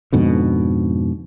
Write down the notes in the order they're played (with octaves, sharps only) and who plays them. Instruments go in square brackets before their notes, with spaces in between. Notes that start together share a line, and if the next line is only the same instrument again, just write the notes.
[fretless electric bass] F2 G#2 B2 D3